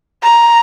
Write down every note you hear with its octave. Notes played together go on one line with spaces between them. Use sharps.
A#5